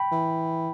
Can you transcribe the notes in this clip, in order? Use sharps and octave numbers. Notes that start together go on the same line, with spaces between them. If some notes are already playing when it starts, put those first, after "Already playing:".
Already playing: G5 B5
E3